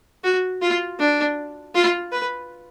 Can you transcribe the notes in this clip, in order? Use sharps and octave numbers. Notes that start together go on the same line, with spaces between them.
F#4
F4
D4
F4
B4